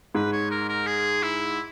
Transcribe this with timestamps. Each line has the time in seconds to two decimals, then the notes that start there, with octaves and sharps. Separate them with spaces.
0.15 G#2 B4
0.33 C#5
0.51 A#4
0.69 A#4
0.87 G#4
1.23 E4